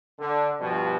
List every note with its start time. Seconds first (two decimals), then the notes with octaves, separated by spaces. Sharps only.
0.18 D3
0.60 G2 B2 F3 G4